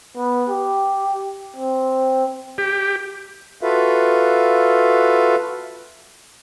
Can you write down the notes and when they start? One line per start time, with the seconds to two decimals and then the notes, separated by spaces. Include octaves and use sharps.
0.17 B3
0.49 G4
1.56 C4
2.58 G4
3.62 F4 F#4 A4 B4 E5 F5